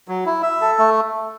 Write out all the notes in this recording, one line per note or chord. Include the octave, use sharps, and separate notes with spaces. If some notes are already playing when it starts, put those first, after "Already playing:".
F#3
E4
E5
A4
A3